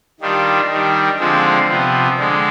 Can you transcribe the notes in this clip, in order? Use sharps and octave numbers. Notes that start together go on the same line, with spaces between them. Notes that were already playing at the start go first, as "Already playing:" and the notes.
D#3 G3 D4 F4
D#3 G3 D4
D3 F3 G#3 C4 F4
C3 F3 B3
D3 G#3